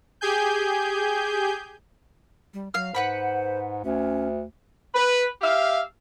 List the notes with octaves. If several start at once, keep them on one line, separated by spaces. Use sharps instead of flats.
G4 G#4 G#5 G6
G3
F#3 F5 F6
G#2 B4 C5 F#5 B5
D2 C#4
B4
G4 E5 F5